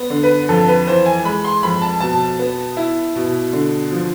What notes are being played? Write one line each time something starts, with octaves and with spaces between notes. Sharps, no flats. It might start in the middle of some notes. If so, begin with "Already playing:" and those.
Already playing: B3
D3
B4
F2 A4
B4
E3 C5
G#5
G#3 B5
C6
F2 B5
A5
B2 A5
B3
E4
B2
D3
F3